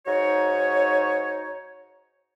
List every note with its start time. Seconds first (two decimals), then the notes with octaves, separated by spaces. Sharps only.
0.07 G#2 D#4 F#4 C#5